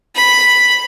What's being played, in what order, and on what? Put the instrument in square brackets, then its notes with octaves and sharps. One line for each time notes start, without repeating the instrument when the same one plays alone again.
[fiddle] B5